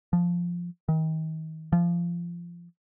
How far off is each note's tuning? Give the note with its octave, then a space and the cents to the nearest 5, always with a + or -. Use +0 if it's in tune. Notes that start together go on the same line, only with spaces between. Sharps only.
F3 +0
D#3 +35
F3 -20